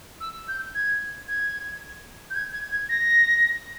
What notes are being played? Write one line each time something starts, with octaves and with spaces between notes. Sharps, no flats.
E6
G6
G#6
G#6
G6
G#6
G#6
G#6
A#6